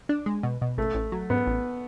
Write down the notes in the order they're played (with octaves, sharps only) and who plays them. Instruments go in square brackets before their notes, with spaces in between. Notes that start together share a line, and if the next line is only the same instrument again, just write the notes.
[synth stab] D4
G#3
B2
B2
[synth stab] A1 [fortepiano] A3
[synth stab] A1
F#3
[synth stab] G#2 [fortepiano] B3
[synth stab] A1